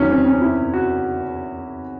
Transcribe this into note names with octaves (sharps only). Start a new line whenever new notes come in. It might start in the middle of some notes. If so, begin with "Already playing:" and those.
Already playing: E2 D#3 F#3 C#4
C4
C#4
E4
F#4